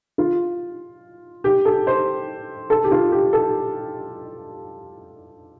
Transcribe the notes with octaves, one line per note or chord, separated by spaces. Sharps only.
F4
G4
A4
C5
A4
G4
F4
G4
A4